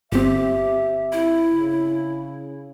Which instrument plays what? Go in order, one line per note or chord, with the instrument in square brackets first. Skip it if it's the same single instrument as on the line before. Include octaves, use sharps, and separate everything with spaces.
[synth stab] G1 C4 [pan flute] G4 [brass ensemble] E5
[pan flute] E4
[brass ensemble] C#3